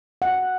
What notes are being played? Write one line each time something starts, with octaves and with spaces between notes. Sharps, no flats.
F#5